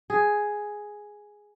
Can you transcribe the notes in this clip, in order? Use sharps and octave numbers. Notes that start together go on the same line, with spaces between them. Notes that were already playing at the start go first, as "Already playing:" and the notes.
G#4